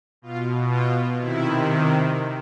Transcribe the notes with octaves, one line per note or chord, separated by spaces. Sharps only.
B2 F4
F4
C3 D#3 E4